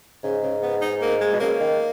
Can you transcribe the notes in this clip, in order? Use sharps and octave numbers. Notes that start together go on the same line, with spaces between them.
G#2 C#3
C#3
B3
D#4
A#3
G#3
B2
C#3 A#3
D#3